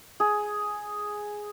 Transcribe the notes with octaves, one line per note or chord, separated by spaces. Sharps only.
G#4